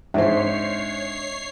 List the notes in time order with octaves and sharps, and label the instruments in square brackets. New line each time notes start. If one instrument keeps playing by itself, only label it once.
[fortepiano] G#2 [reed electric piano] D4 [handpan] C5 E5 [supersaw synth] C#5 C7